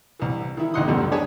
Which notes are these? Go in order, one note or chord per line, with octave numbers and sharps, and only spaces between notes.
C2 E3
D#3 E4
A1 D2 D#5 F#5 C6 D#6
C#2 F#2 G3 A3
D4 G4 G#4 C#5 G#5 A5